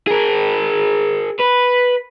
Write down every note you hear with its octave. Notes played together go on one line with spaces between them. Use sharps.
G#4 A#4
B4